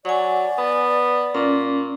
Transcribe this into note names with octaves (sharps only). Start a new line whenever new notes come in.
F#3 D5 F#5 G#5
B3
A#2 C#4